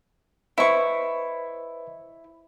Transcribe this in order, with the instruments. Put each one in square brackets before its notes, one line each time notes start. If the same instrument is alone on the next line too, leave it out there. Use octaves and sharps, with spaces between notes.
[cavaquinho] E4 C#6 [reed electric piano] B4 C5 D#5